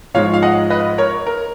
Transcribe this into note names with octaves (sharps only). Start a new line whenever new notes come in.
G#2 F3 G#3 C#5 F5
F5
D#5 F#5
B4 D#5
A#4 C#5
A#4